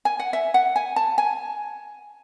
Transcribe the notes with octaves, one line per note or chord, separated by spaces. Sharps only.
G#5
F#5
E5
F#5
G#5
A5
G#5